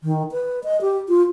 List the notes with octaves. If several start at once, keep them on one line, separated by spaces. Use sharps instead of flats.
D#3
B4
D#5
G4
F4